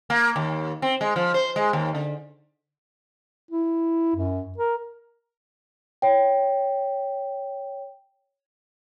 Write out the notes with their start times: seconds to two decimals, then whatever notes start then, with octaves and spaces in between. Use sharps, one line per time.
0.10 A#3
0.36 D#2
0.82 C4
1.01 G#3
1.16 F3
1.34 C5
1.56 G#3
1.73 D#2
1.95 D3
3.51 E4
4.15 F#2
4.58 A#4
6.02 C#5 G5